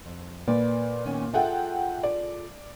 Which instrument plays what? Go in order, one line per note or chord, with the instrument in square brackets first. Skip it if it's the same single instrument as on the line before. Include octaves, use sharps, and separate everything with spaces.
[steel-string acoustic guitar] F2
[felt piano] A#2 [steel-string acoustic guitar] B4 D5
[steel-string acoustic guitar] D#3 B3 C#4
[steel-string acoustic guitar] F4 G#4 A4 [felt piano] E5 F#5 G5
[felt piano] D5